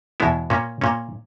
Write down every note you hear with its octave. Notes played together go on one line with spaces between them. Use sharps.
E2 B2 G#3 B3 E4
A#2 A#3 C#4
A#2 A#3 C#4